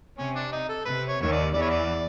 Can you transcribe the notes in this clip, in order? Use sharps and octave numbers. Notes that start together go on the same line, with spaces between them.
C3 C#4
D4
D#4
A4
C3 B4
C#5
D#2 D#3 C#5
D5
E2 E3 D5
C#5
D5